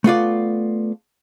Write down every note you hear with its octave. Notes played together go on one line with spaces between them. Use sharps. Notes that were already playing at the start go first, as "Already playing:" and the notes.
A3 B3 F4 D5